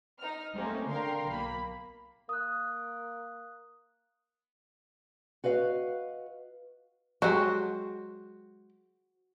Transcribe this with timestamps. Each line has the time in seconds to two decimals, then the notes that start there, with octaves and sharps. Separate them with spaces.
0.19 D#4 F6
0.54 A3 A#3 C4 C#4 D#4 G4
0.88 D3 A#4 F5 G5 C6 C7
1.27 B1 A#3 B5
2.29 A#3 D#6 F#6
5.44 F#4 B4 D#5 F5
7.22 F#3 G#3 F#4 G4 C5